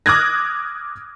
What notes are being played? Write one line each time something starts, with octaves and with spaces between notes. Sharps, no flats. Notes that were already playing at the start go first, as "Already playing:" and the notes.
D6 D#6 F6 F#6 G#6 A#6